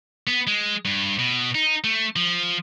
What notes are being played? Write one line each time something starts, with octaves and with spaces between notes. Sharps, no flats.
B3
G#3
G2
B2
D#4
A3
F3